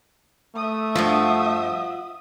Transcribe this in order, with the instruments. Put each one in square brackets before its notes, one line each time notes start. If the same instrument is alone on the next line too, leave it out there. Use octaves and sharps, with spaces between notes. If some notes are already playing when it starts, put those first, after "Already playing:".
[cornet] A3 [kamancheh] E5 D#6
[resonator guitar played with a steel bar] G2 F3 [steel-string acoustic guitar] F4 F#4